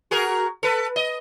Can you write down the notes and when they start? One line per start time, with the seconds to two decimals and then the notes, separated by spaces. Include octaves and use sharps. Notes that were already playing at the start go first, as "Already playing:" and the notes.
0.11 F#4 G#4 A#4
0.63 A4 B4
0.96 D#5